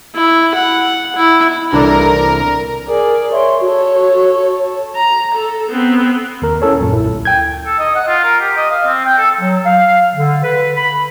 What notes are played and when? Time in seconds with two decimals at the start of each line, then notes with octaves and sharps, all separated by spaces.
0.15 E4
0.55 F#5
1.16 E4
1.73 C2 E3 D4 A4 A#4 D5
2.88 G#4 A#4 D5
3.32 C#5 E5 C6
3.61 F#4 A4 C#5
4.96 A#5
5.35 A4
5.70 B3 C4
6.42 D#2 A#4
6.62 C#4 E4 A4 C#5
6.79 B1 F#2 A#2
6.93 B1 E4
7.07 D2
7.25 G5 G6 G#6
7.66 A4
7.79 D#5
7.95 F#5
8.08 F4
8.24 A#4
8.40 G4
8.57 D#5
8.70 F5
8.86 C4
9.05 G5
9.18 A4
9.40 F#3
9.66 F5
10.15 D3
10.44 B4
10.76 B5